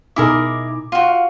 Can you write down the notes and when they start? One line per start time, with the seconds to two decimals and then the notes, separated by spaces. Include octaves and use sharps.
0.16 B2 D#4 E4 G#4 A#4 D6
0.92 F4 F#4
1.09 F5